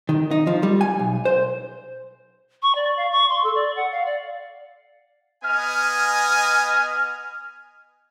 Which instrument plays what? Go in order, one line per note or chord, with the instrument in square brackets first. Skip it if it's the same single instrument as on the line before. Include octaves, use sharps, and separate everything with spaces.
[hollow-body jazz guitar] D#3
D#4
F3
G3
G#5
B1
C5
[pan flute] C#6
D5
F5
C#6
C6
A4
D5
F#5
F5
D5
[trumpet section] B3 D#5 G#5 [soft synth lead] F6